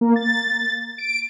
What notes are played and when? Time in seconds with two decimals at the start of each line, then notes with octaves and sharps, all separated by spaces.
0.01 A#3
0.16 A6
0.98 D7